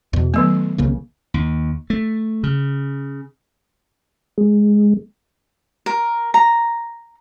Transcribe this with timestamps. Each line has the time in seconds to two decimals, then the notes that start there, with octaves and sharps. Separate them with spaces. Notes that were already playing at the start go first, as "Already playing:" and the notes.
0.13 E2 B2
0.34 D#3 F#3 A3 B3
0.78 C2 C#3 A#3
1.34 D#2
1.90 A3
2.43 C#3
4.38 G#3
5.86 A#4
6.34 A#5